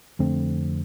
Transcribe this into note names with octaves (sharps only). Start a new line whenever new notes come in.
F2 D3 A3 C4